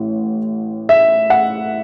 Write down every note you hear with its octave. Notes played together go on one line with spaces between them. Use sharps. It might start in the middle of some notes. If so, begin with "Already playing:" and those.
Already playing: A1 A2
E5
F#5